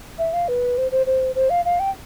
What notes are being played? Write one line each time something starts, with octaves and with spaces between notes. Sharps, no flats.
E5
F5
B4
C5
C5
C5
C5
F5
F5
G5